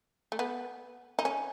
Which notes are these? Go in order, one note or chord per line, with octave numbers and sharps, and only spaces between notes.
A3
B3
D#4
C#4